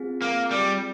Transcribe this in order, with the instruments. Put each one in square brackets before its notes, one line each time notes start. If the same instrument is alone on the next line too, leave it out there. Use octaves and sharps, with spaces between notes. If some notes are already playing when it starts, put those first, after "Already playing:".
Already playing: [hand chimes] C4 F4 G#4
[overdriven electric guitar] A#3
G3